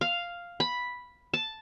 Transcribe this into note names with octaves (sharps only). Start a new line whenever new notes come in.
F5
B5
A5